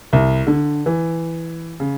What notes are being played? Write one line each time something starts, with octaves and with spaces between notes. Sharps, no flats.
C2
D3
E3
C#3